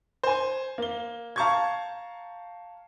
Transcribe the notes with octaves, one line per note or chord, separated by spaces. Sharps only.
C5 G#5
A#3 G7
F5 A5 A#5 C#6 G6 G#6